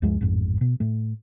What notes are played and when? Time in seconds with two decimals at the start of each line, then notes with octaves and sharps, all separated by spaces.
0.02 D2 G2 F3 G#3
0.21 A1 F2 G#2
0.61 B2
0.80 A2 A3